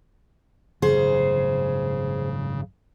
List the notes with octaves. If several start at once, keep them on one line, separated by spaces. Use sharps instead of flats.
G#1 F#2 C#3 G#4 C5